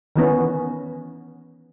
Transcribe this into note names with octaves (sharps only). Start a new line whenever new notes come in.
D#3 E3 B3 C#4